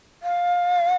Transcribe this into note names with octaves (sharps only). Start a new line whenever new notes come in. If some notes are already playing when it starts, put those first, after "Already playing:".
F5